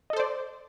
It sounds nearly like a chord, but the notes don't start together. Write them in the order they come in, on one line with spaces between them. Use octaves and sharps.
D#5 A4 C5 D5